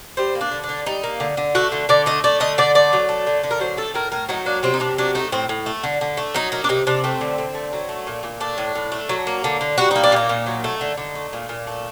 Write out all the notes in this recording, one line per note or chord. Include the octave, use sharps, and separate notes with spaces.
G3 C5
A#3
D4
D3
D4
D3
G3 D#4
A#3
D3
D3
A3 F#4
D3
D3 D5
A3 D#5
A3 D5
D3 D#5
D3 D5
A3 D5
F#3
A3
D3
D3
A#4
F#3 C5
A3 A4
A2 A#4
A2 A#4
F#3 D#4
A#3 D4
C3 C4
D#4
C3 D4
F#3 D4
A3 D#4
A2 C4
A2
A3
D3
D3
A3
F#3 D#4
A#3 D#4
D4
C3 D#4
C3 D4
A3 C4
D3
D3
A3
F#3
A3
A#2
A#2
A3 D4
A2
A2
A3
F#3
A#3
D3
D3
G3 F#4
A#3 D#4
D4
A#2 D#4
A#2
F#3
A3
D3
D3
A3
A#2
A#2
A3